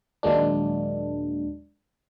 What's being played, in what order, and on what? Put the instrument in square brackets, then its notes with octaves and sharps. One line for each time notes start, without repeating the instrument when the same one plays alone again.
[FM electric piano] D#2 A#2 F#3 G#3 A#3 D4